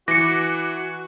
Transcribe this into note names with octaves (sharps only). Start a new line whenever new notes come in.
E3 F#4 D6 A#6 C#7